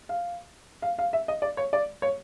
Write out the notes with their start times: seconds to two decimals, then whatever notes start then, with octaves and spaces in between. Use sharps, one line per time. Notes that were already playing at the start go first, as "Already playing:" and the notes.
0.09 F5
0.82 F5
0.99 F5
1.13 E5
1.28 D#5
1.42 D5
1.57 C#5
1.73 D5
2.02 C#5